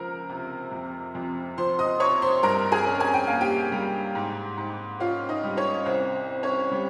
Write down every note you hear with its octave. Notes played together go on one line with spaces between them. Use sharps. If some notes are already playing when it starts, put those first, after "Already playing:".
Already playing: C#2 F3 C4 A#4 A#5
C3
F2
F2
F3 C5 C6
D#5 D#6
C3 C#5 C#6
C5 C6
G2 A#4 A#5
G#4 G#5
C#4
G#5
G5
A#3 F5
G4 G5
G3
G#2
G#2
C#4 F4 F5
D#4 D#5
G3
C#4 C#5
C2 C5
C4
C#4 C#5
G3